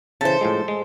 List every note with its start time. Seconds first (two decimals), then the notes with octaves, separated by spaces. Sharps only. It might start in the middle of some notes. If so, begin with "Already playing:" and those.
0.21 C#3 E3 A4 C5
0.41 A2 F3 G#3
0.68 G#3